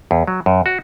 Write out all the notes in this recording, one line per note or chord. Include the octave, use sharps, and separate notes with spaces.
E2
F#3
F#2
F#4